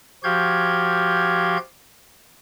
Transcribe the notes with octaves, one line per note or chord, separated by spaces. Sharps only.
F3 F#4 G4 F5 G6 G#6